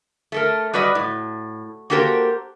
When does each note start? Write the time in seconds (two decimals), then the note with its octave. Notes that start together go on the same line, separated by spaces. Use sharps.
0.32 A3 A4 A#4
0.74 G3 F#4 B4 D5 D#5
0.95 A2
1.90 A#3 F#4 G4 A4 A#4 C5